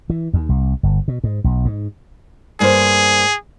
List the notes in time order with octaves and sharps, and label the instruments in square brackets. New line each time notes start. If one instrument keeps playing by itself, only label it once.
[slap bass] E3
D#2
C2
G1
B2
G#2
B1
G#2
[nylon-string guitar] G2 A#3 C5 [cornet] G#4